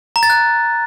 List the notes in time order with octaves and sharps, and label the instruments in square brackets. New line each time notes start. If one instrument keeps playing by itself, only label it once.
[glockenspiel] A#5
A6
F#6